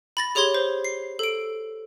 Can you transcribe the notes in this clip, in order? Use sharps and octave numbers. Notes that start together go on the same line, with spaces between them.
B5 A6 A#6
G4 G#4 C#5 C6 G#6 G7
C5
C7
A4 D7